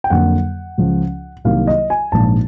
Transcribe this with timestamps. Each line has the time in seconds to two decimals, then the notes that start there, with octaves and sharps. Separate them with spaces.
0.04 G5
0.10 F2 D3 F#3 A#3 F#5
0.78 C#2 C#3 F3
1.44 C2 C3 D#3 F#3 A#3 F5
1.67 D#5
1.90 G#5
2.12 A#1 G#2 F3 A5